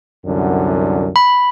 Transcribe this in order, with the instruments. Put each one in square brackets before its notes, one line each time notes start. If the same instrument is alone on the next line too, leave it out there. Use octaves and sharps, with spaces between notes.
[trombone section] C2 F#2 D3
[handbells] B5